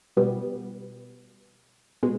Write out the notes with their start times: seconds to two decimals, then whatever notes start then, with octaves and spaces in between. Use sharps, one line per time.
0.17 B2 G3 B3
2.03 B2 G#3